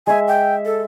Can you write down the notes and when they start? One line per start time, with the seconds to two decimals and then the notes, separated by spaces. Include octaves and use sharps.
0.07 G#3 E5 G#5
0.28 G5
0.66 A4